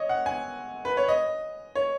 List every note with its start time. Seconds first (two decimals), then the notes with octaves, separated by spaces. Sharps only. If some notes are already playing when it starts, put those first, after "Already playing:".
Already playing: C#5 D#5
0.09 F#5
0.26 G#5
0.85 B4
0.97 C#5
1.08 D#5
1.76 C#5